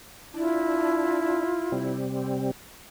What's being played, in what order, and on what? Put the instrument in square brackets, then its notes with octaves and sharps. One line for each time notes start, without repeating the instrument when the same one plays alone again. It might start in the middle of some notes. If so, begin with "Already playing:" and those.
[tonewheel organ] D4 [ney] E4 [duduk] F4
[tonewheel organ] C3 G3 C4